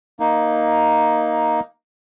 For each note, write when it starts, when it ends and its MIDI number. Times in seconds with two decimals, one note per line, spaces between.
0.20 1.60 58
0.20 1.60 63